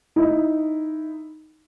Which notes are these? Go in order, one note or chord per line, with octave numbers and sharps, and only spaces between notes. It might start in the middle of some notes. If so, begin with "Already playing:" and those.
D#4 E4